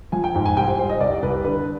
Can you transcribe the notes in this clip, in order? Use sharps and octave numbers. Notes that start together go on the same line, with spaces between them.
F3 G#5
G5
G#2 G5
G#5
C2 G5
C5
G3 C5
D#5
C2 D5
C2 B4
D3 B4